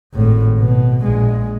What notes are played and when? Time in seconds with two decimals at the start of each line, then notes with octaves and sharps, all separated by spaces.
0.14 G#1 A2
0.59 B2
1.02 A#1 G#3